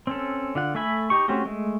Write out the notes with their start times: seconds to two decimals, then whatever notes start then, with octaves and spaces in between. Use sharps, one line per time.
0.07 C4 C#4 A4
0.55 D3 F4 F#5
0.75 A3 A4 E5 G#5 B5
1.10 D#4 G4 C#6
1.28 A3 C4 C#4 F#4 G4
1.45 G#3 A3